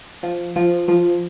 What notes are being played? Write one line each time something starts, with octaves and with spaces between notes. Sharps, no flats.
F3
F3
F3